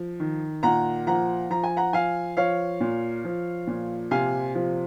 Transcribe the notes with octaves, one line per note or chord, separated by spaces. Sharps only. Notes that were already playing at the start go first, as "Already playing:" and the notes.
Already playing: F3
D#3
A#2 F#5 A#5
F3 F#5 A#5
F3 A#5
G#5
F#5 A#5
F3 F5 G#5
F3 C#5 F5
A#2
F3
A#2
C3 F5 G#5
F3